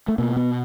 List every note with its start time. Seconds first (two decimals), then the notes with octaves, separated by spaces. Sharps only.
0.08 A3
0.18 B2 A#3
0.36 B3